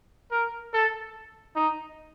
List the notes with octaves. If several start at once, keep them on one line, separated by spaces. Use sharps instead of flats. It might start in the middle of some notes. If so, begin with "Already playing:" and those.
A#4
A4
D#4